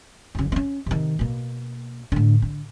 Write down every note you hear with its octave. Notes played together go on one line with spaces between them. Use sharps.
F#1 C#3
B3 C#4
C3 D#3
B2 A#3
A2 D3
D3